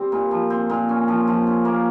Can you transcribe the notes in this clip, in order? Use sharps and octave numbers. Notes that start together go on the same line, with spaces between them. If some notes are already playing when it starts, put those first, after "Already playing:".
Already playing: G3 C4
A#2
F3
C4
A#2
C#4
F3
F3
C#4
A#3